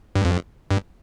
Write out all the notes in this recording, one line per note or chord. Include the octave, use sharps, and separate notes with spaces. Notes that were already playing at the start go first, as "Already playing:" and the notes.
G2
F2
G2